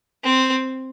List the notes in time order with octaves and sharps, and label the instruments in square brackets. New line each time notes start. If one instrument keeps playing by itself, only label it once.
[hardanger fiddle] C4